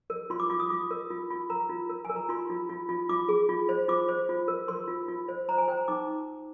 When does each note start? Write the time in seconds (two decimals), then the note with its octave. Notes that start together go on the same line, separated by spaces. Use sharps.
0.10 A#4
0.30 F4 C6
0.40 D6
0.50 F4 D6
0.60 D#6
0.70 F4 D6
0.91 A#4
1.10 F4
1.30 F4
1.50 A#4 A#5
1.69 F4
1.89 A#4
2.05 A#4 G#5
2.16 A#5
2.29 F4 C6
2.50 F4
2.69 F4
2.89 F4
3.09 F4 D6
3.29 G#4
3.49 F4
3.69 C5
3.88 F4 D6
4.08 C5
4.29 F4
4.48 A#4
4.68 A#4 C6
4.88 F4
5.08 F4
5.28 C5
5.49 C5 A#5
5.58 G#5
5.68 C5 G5
5.77 A#5
5.88 D#4 D6